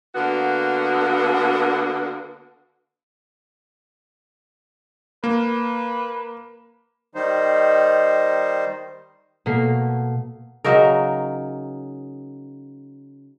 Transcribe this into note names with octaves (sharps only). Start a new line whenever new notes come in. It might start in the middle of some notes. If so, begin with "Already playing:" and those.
D3 A#3 B3 F#4
A#3 B4
D#3 G3 D#4 C5
B2 A3 A#3 C7
C#3 F#3 D#4 A#4